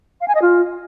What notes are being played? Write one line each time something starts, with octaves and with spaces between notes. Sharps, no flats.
F5
G#5
D#5
F4